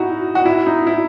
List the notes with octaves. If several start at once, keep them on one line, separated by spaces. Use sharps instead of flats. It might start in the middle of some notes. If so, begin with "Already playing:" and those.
Already playing: D#4 E4 F#4
F#4
E4
D#4
E4